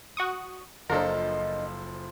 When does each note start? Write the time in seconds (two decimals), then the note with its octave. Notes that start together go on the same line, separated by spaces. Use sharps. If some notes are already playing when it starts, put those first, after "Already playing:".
0.17 F#4 C#6 D#6
0.89 F#1 F3 D4 F4 A4 A#4 D#5